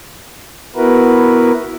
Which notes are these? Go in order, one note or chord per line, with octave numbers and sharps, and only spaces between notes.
B3 E4 F#4 A#4 B4